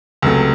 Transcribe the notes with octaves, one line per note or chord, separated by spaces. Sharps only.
C#2 C3 F#3 A3